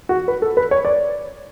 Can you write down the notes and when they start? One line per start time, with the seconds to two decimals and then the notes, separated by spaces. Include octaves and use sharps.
0.09 F#4
0.28 B4
0.42 A4
0.57 B4
0.71 C#5
0.85 D5